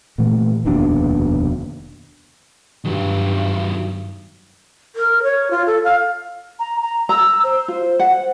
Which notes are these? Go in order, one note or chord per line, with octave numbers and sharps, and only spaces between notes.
A#2 E3 A3
F1 D#2 B2 D4
G2 D#3 F#3
A#4
C#5
F4
A4
F5
A#5
A#5
A#5 E6
C5
F4
F#5